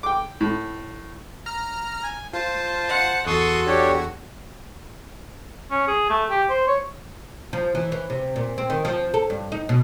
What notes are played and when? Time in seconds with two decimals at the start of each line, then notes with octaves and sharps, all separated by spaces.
0.03 G5 D6
0.41 A2
1.46 A#5 F6
2.03 G#5
2.33 F4 C5 A5
2.89 F#5
3.27 E2 F#4 A4 C6 C#6 D#6
3.67 D4 G4 C#5
5.71 C#4
5.88 G#4
6.10 A3
6.30 G4
6.49 C5
6.67 C#5
7.53 F3
7.75 E3
7.92 E3
8.10 C3
8.36 A#2
8.58 C4
8.70 D#3
8.85 F3
9.14 A4
9.30 G2
9.52 D#4
9.69 B2